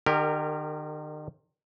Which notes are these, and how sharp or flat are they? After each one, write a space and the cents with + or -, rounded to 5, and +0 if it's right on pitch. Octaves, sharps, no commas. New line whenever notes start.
D#3 -40 G4 +20 A#4 -20